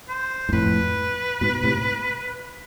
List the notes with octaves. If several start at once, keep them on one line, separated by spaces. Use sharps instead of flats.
C5
G#2
F2 A2 B4
G#2 B2
A2 C3